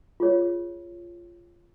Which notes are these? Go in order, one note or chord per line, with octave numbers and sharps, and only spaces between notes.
F4 G#4 C#5